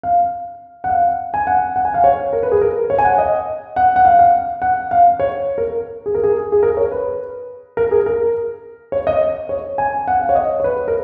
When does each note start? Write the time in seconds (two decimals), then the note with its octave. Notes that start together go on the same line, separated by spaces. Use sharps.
0.03 F5
0.84 F#5
0.90 F5
1.34 G#5
1.47 F#5
1.76 F#5
1.85 G#5
1.94 F5
2.04 C#5
2.33 A#4
2.43 B4
2.52 G#4
2.61 A#4
2.90 C#5
2.99 G#5
3.04 F#5
3.18 D#5
3.76 F#5
3.96 F#5
4.05 F5
4.19 F5
4.62 F#5
4.91 F5
5.20 C#5
5.58 A#4
6.06 G#4
6.15 A#4
6.24 G#4
6.52 G#4
6.63 A#4
6.77 C#5
6.92 B4
7.77 A#4
7.91 G#4
8.06 A#4
8.92 C#5
9.07 D#5
9.49 C#5
9.78 G#5
10.08 F#5
10.21 F5
10.29 C#5
10.35 D#5
10.60 C#5
10.64 B4
10.88 A#4